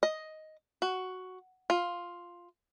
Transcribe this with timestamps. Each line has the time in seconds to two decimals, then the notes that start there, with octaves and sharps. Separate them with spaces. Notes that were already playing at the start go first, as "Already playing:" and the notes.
0.03 D#5
0.82 F#4
1.70 F4